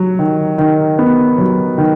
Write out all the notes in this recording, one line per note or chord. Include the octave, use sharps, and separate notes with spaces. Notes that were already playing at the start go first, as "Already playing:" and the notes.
Already playing: F#3
D#3
D#3
B3
F#3
D#3